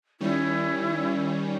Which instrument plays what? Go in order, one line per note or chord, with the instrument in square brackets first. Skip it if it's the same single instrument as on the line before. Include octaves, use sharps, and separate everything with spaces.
[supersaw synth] D#3 G3 C#4 [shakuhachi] E4